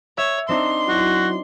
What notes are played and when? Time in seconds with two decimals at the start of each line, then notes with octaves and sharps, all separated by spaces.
0.18 C#5 E5
0.49 C4 D4 D#4 C6
0.88 F#3 E4 F#4